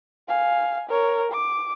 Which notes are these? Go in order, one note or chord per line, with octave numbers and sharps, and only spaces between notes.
F5 G#5
A#4 C#5
D6